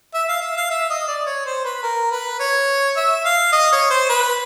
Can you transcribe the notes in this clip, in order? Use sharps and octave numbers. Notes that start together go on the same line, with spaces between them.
E5
F5
E5
F5
E5
D#5
D5
C#5
C5
B4
A#4
B4
C#5
E5
F5
D#5
C#5
C5
B4